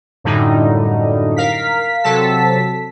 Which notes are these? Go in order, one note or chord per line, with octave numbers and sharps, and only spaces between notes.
F#2 A2 D3 G3 D#4
A#4 F5 B6
C3 F#3 A4 A5 B6